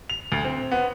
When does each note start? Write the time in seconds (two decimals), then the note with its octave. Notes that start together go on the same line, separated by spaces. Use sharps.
0.10 F7
0.32 D2
0.44 C4
0.72 B3